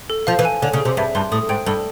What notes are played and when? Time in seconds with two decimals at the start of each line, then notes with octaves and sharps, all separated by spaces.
0.10 A4
0.27 F3 F5
0.39 E3
0.45 G#5
0.62 D3 C#5
0.73 C#3
0.80 G#4
0.85 C3
0.97 G2 E5
1.15 G2 C6
1.32 A2 D#6
1.49 G#2 G5
1.66 G2 A4